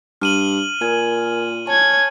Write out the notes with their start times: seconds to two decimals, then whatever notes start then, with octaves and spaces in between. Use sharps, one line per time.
0.21 G2 F6 D#7 F#7
0.81 A#2 A#4 G#5 G#6
1.67 C#5 G#5 A5 G#6